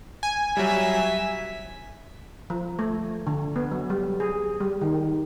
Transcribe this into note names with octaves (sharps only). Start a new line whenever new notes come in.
G#5
F#3 G3 E5
F3
A3
D3
B3
F#3
G3
G#4
G3
D#3